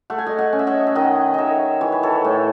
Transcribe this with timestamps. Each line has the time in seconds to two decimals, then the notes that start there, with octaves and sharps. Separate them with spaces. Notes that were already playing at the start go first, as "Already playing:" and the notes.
0.10 A3 F#5
0.18 G#5
0.27 D#5 F#5
0.38 D#5 F#5
0.53 C#4
0.59 E5
0.67 D#5 F#5
0.87 E5
0.95 D#3 D#5 F#5
1.34 D#3 C#5 D#5 E5
1.81 E3 C#5
1.92 B4
2.03 A4 C#5
2.24 A2